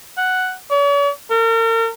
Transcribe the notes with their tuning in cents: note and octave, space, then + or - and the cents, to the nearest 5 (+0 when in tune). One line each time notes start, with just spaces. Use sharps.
F#5 +5
C#5 +45
A#4 -40